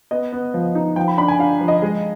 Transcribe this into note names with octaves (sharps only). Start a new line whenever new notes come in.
B3 D#5
B3
F3
D#4
F3 G5
B5
D4 B5
G#5
D4 F5
F3
D#5
G#3